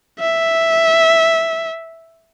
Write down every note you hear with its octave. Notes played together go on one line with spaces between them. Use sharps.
E5